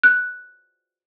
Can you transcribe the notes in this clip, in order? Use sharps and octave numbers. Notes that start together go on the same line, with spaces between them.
F#6